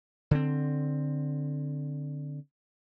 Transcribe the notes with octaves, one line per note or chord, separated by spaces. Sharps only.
D3 C4